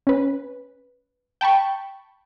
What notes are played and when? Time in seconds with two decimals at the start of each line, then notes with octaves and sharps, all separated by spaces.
0.07 C#4 B4
1.41 G5 A5 B5 C#6